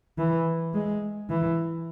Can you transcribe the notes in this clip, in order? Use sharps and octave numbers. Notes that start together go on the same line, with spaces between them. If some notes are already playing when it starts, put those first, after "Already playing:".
E3
G#3
E3